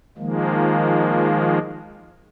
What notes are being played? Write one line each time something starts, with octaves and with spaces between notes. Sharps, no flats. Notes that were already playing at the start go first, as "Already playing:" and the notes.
D#3 F3 G#3 A#3